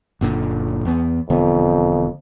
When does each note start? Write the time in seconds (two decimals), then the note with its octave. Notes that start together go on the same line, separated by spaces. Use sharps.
0.21 F#1 A#2 D3
0.85 E2 B3
1.30 E1 F2 D3 B3